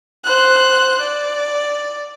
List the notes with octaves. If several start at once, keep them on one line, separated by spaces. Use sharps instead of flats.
C5 F#6
D5